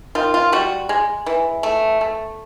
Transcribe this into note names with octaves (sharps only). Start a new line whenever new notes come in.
D#3 F4
F4
G3 F#4
G#3
E3
A3
A3